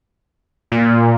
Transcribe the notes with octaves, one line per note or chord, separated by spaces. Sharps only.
A#2